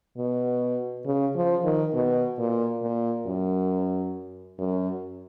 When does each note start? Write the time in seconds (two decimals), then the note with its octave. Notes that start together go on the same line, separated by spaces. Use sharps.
0.18 B2
1.06 C#3
1.36 F3
1.65 D#3
1.94 B2
2.39 A#2
2.82 A#2
3.26 F#2
4.59 F#2